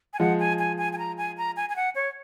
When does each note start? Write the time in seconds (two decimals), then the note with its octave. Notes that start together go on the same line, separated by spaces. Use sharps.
0.13 G#5
0.20 F3 G#3 F#5
0.40 G#5
0.59 G#5
0.78 G#5
0.93 G#5
0.98 A#5
1.18 G#5
1.38 A#5
1.57 G#5
1.69 G#5
1.76 F#5
1.95 C#5